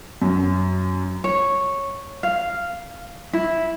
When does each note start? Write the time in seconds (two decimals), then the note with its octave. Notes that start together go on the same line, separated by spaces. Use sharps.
0.22 F#2
1.24 C#5
2.23 F5
3.33 E4